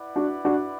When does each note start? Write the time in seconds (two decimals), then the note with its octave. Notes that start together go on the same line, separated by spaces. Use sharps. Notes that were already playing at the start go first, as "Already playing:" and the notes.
Already playing: E4 B4 D5 F#5
0.16 D4 F#4
0.45 D4 F#4